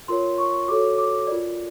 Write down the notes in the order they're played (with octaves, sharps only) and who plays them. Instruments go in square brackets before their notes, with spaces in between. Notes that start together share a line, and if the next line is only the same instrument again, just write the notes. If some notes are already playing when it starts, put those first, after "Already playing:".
[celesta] F4 A#4 C#5 C6
C#6
F#4 A4 C#5 D6
D6
F4 A#4 D5